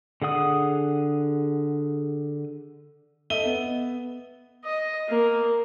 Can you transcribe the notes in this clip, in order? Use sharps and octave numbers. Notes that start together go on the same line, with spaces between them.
D3 G#4 F#5 D#6
A4 D#5 E5 D#7 G7
B3
D#5
A#3